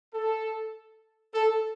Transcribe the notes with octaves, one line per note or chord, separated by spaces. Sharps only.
A4
A4